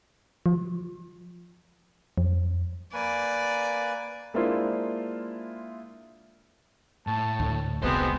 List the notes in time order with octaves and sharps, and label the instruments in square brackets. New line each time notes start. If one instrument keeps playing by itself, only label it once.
[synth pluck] F3
F2
[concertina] A#3 B4 G#5 [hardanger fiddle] D5
[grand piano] G#3 A#3 D4 E4 F4 C5
[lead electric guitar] A2 [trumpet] A5
[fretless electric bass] D2
[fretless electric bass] E1 C2 [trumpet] G#3 [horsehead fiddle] B3 C4 [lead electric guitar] F#4 C5